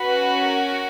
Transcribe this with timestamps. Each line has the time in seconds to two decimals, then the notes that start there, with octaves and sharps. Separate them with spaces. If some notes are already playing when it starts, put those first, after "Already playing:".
Already playing: C#4 F#4 B4
0.53 A#4